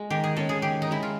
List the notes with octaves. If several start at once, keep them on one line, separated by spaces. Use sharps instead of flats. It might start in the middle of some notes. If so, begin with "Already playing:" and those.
Already playing: G#3
D#3 G4
G#4
G#3 C#4 A4
G#4
D#3 G4
D#4
G#3 C#4 E4
F4